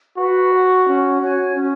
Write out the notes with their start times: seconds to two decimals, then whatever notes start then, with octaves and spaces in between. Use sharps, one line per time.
0.18 F#4 B4
0.52 F#5 C#6
0.86 C#4
1.20 F#4 C#5 G#5
1.54 C#4